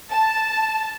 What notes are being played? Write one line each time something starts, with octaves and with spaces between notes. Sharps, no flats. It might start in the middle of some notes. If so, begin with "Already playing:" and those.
A5